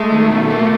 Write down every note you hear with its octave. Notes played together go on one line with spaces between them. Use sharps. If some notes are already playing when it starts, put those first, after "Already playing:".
Already playing: G#3 A3
D#3
B2
A#3